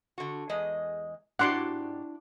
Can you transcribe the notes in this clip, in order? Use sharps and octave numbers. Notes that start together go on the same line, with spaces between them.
D3 F#4
E2 G#3 D#5
G#2 D4 E4 F#4 G4 D5 F#5 C6